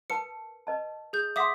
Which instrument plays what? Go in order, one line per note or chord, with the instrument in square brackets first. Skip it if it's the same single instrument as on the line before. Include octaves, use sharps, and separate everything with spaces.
[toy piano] A#4 B4 A5 [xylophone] C#7
[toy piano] B4 D#5 A5
[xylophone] G#4 G6
[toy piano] E5 F#5 C6 [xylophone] D6 D#6 B6